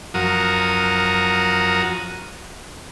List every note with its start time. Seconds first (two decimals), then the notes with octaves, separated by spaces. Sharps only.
0.14 F#2 F3 F#4 A#4 D#6